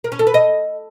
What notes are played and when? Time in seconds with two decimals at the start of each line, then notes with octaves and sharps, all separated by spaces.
0.04 A#4
0.12 C#4
0.19 A4
0.27 B4
0.34 D#5